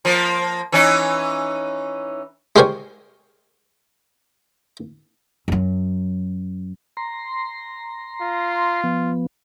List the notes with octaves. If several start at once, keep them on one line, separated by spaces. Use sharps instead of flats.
F3 A#3
E3 C#4 D#4
G#3 G4 A#4 C5 C#5 G#5
F#2 F#3
A#5 C6
F4
F3 B3